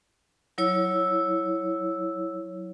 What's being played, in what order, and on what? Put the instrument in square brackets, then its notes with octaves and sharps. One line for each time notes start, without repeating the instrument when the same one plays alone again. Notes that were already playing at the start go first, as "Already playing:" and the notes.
[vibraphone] F#3 E4 C#5 E6